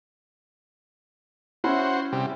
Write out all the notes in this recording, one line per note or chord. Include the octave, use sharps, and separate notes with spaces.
C#4 E4 F#4 C5
C3 G3